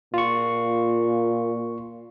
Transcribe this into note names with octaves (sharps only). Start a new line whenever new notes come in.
A#2 F4 C#6